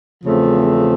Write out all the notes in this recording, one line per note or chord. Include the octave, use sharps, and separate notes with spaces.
E2 C#3 F3 A3 C4